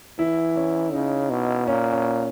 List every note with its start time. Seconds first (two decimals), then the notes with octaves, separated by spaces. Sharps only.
0.19 E3 E4
0.57 C#4
0.93 C#3 D#4
1.30 B2
1.67 A#2 C#4
1.92 C#4